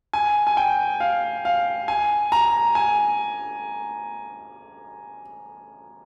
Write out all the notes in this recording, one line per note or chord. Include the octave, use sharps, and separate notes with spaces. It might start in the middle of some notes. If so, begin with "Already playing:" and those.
G#5
G#5
G5
F5
F5
G#5
A#5
G#5